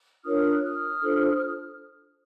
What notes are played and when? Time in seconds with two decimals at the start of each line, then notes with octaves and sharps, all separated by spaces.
0.24 D4 F4 A#4 C#5 D#6 F6
0.52 F#6
0.63 D#6 F6
1.01 D4 F4 A4 C5